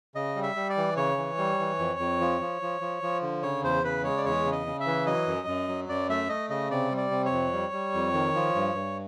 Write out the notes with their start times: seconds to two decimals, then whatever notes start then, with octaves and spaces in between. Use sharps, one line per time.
0.15 C#3 D#5
0.36 G3
0.43 E5
0.56 G3
0.70 D5
0.77 E3
0.97 C#3 C#5
1.18 E3
1.38 G3
1.59 E3
1.79 F2
1.99 F2
2.21 F3
2.41 F3
2.62 F3
2.81 F3
3.03 F3
3.22 D3
3.43 C#3 C#5
3.63 E2 C5
3.84 C#3 B4
4.04 G#3 C#5
4.17 D5
4.25 E2 C#5
4.45 C#3
4.52 D#5
4.66 C#3
4.80 E5
4.86 E3
5.06 F#3 D#5
5.27 F#2
5.47 F#2
5.69 F#3
5.89 F#2 D5
6.09 A3 E5
6.29 A3 D#5
6.50 C#3 D#5
6.71 C3 D5
6.91 G3
6.97 D5
7.11 C3
7.26 C#5
7.32 F2
7.53 G3
7.72 G3
7.94 F2
8.14 D#3
8.35 F3
8.55 G2
8.75 G2